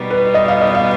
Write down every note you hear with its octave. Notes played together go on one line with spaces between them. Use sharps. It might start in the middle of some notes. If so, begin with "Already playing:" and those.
Already playing: B2 G3 B3 D#4
B4
D#5
F5
D#5
F5